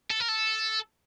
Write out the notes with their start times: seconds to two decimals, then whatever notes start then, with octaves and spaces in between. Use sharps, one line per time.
0.10 A4
0.20 A#4
0.28 A4